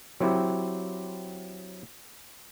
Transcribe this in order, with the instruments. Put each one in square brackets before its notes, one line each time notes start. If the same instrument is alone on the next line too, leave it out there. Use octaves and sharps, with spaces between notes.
[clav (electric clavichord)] F#3 C4 E4 G4